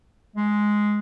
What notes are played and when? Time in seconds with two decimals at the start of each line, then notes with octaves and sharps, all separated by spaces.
0.36 G#3